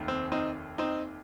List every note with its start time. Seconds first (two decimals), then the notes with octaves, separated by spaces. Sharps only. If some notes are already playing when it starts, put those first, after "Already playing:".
Already playing: F1 D#2 D#3
0.08 C4
0.32 C4 D#4
0.78 C4 D#4